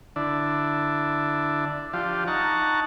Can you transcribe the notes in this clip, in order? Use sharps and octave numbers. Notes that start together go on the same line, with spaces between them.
D3 D4 E4
F3 D4 F4 G4
D#4 F#5 A5 A#5 C#6